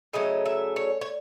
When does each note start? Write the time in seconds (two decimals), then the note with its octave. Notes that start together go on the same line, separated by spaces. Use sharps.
0.13 C#3 F#3 A3 C#4 D#5
0.46 E5
0.76 C#5
1.01 C#5